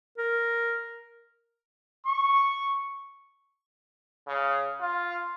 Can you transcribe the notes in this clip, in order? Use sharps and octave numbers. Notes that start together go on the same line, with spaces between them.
A#4
C#6
C#3
F4